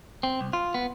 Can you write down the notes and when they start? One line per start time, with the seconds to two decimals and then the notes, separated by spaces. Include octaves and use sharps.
0.23 C4
0.41 C2
0.53 F4
0.74 B3